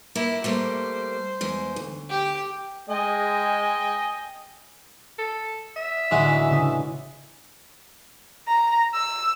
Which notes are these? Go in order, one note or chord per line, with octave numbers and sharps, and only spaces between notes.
A#3 E4
G3 A3 A#3 C5
E2 G#3
D2
G4 G5
G#3 D#5 G5 G#5
A4
E5
A1 D2 E3 G#3 F#4
C#3 D4 D#6
A#5
E6